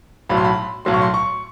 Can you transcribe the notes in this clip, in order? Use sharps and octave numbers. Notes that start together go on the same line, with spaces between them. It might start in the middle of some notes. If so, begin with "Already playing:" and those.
B1 A2 F#3 B5
C6
B5
B1 A2 F#3 C6
C#6
C6
C#6